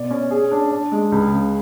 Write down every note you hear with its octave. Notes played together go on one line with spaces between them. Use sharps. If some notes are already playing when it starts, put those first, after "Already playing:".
Already playing: B2 D5
C#4
G#4
D4
D4
G#3
C#2
C#3